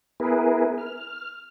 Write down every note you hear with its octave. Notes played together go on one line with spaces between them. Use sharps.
B3 E4 G#4 A#4 B4
F6